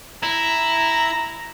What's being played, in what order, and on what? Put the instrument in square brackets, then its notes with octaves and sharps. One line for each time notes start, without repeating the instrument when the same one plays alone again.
[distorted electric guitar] E4 [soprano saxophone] A#5